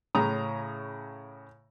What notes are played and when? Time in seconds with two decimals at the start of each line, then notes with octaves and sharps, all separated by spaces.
0.15 A2 C#3 A#5 D#6